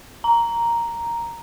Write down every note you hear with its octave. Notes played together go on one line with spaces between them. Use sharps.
A#5